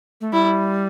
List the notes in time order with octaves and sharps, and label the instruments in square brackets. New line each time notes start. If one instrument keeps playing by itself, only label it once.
[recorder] A3
[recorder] G3 [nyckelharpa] E4